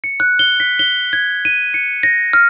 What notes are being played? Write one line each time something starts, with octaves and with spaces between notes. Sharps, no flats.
C#7
F#6
G7
B6
G7
G#6
D#7
C#7
A#6
F6